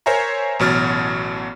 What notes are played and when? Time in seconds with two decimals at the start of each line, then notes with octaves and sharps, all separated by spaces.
0.06 A#4 C5 C#5 E5 G#5 A#5
0.59 A1 B2 F#3 F6 A6